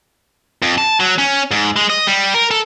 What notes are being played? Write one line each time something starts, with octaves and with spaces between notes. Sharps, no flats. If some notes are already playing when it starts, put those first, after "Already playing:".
F2
A5
F#3
C#4
G#2
G#3
D#5
G3
A#4
A4